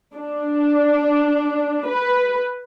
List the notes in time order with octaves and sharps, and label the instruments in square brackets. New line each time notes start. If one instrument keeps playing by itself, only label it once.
[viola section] D4
B4